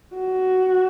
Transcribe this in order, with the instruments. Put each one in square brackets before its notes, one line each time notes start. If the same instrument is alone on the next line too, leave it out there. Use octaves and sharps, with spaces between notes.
[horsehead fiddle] F#4